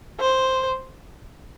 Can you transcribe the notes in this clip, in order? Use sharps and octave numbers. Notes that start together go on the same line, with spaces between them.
C5